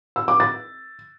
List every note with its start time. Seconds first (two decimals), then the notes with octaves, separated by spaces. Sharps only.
0.16 E6
0.28 D6
0.40 A6